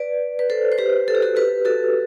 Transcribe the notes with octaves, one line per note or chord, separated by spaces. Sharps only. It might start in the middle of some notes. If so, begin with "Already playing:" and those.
Already playing: B4 D5
B4
A4 C5
C5
G4 B4
A4
G4
F#4 A4
G4 B4
F#4 A4